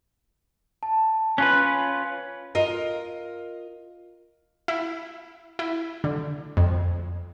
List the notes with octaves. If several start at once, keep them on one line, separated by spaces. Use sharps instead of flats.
A5
C#4 F4 B4 F#6
F4 A#4 D#5
E4
E4
D3
F2